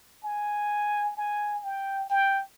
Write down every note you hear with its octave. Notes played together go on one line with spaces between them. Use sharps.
G#5
G#5
G5
G5